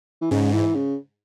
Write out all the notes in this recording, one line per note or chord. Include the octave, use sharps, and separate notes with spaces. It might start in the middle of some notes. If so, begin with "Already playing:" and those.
E3
G#2 C#3
E3
C#3